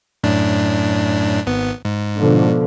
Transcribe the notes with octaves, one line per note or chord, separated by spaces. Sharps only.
F#2 A2 D4
G#1 B3
G#2
B2 D3 F3